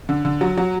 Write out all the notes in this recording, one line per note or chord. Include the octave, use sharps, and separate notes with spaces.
D3
D3
F#3
F#3